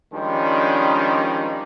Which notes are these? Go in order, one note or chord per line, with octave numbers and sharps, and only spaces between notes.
D#3 F3 G3 G#3 C#4 D4